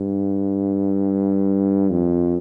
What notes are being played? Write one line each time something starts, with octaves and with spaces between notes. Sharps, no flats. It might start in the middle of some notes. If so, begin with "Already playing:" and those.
Already playing: G2
F2